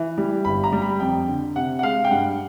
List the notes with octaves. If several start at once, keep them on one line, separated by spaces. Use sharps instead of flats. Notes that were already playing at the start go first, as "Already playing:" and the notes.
Already playing: E3
G3
G1 B5
A#5
G3
B5
F2 G5
D3
C3 F#5
F#5
G#3 F5
G5
G2 F#5